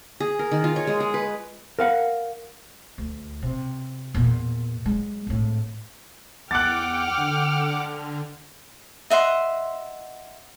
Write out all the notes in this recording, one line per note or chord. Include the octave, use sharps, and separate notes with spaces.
G#4
A#4
D#3
F4
C#5
G#3
G#4
B4
A#4 F5 F#5
D2
C3
E2 A#2
F#3 G#3
G#1 A2
E2 F#5 G5 D6 F6 F#6 A6
D3
D#5 E5 F#5 C6